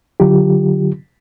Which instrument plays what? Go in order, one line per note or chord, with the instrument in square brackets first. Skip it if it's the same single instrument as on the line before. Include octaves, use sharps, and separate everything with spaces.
[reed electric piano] D3 F#3 F4 G4